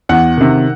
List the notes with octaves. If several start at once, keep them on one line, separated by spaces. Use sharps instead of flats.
E2 F#5
C3 D#3